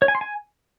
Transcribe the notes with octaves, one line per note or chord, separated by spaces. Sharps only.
C#5
G#5
C6
G#5